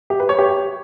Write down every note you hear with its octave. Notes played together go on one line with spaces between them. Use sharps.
G4
B4
C#5
G4